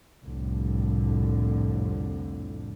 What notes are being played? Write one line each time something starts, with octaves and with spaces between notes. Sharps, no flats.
C2 F2 A2 D3